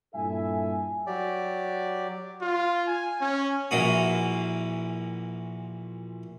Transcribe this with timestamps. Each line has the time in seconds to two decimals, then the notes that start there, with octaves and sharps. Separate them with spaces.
0.15 G2 A#2 E4 A4 E5 G#5
1.07 F#3 G4 D5
2.41 F4
2.88 G#5
3.21 C#4
3.71 A#1 A#2 E3 A#3 F#4 D#6